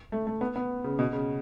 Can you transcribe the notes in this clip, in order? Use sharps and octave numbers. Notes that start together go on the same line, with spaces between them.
A3
A3
B3
B3
C#3
B2
C#3